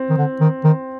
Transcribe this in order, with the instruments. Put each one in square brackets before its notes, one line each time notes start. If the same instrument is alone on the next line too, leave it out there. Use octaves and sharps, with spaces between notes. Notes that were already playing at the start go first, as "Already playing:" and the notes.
Already playing: [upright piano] C4
[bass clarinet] D#3
D3
D#3
D#3